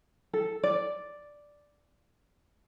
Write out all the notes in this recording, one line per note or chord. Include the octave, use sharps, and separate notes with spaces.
A4
D5